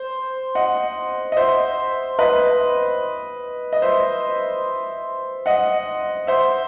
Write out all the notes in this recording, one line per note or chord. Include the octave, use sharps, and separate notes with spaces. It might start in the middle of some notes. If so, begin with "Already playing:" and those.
Already playing: C5
D#5 F#5
D#5
C5 E5
B4 D#5
D#5
C5 E5
D#5 F#5
C5 E5